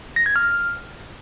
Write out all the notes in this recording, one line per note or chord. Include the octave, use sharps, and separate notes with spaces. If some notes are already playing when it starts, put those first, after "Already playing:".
A#6
G#6
F6